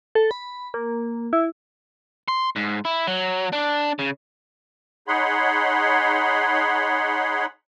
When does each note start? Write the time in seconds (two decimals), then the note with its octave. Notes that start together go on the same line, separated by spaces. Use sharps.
0.15 A4
0.31 B5
0.74 A#3
1.33 E4
2.28 C6
2.56 G#2
2.85 E4
3.08 F#3
3.53 D4
3.99 C#3
5.08 D#4 G#4 C#5 F#5 B5 C6